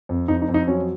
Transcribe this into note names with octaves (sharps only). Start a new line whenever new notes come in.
F2
F2 D#4
D#4
F2
D#4
F#3 C#4